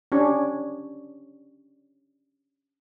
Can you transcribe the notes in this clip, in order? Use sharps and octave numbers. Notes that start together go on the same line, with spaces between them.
C#4 D4 G4 C#5